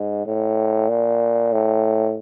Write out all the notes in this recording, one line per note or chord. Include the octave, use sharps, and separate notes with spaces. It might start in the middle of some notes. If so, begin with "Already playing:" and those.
Already playing: G#2
A2
A#2
A2